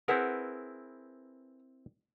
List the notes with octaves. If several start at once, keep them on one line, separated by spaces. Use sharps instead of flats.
C4 E4 G#4 A#4 B4 F#5